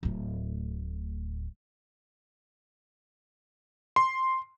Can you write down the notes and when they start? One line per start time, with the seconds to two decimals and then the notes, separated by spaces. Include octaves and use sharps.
0.03 D1 A2
3.96 C6